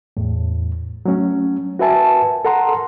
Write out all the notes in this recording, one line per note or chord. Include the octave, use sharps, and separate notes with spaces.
E2 A2
F#3 A3 C#4
F#4 A#4 B4 E5 G#5 A5
A4 A#4 F#5 A#5 C6